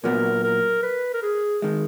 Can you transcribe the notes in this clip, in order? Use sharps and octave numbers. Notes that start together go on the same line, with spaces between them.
A#2 F#3 B3 A#4
A#4
B4
A#4
G#4
D#3 G#3